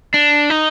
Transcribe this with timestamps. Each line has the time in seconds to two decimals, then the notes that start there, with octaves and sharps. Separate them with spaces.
0.14 D4
0.50 D#4